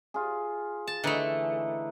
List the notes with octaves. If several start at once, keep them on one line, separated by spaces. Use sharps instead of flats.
F4 G#4
A5
D3 E3 A3 D#4